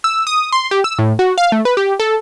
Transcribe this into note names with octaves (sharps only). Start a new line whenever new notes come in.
E6
D#6
C6
G4
E6
A2
F#4
F5
A3
B4
G4
A4